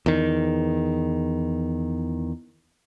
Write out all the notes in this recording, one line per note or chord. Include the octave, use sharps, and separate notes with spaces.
E2 D#3